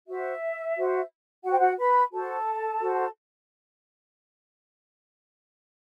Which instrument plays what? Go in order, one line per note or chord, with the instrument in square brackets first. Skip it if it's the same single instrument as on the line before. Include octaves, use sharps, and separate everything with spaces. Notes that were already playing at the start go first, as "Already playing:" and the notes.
[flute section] F#4 C5 E5
F#4 C5
F#4 F#5
C5 G5
F#4 F#5
B4 B5
F#4 A4 C5 A5
F#4 C5